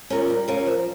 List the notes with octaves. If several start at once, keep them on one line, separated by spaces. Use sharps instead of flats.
C#4 F4 A#4
G3
C#4 F4 A#4
F3